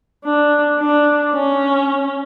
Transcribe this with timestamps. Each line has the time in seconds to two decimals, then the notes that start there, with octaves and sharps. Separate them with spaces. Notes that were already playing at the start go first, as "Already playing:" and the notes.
0.24 D4
0.79 D4
1.34 C#4